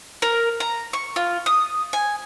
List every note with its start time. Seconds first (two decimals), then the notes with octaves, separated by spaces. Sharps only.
0.22 A#4
0.60 A#5
0.93 C#6
1.16 F4
1.46 D#6
1.93 G#5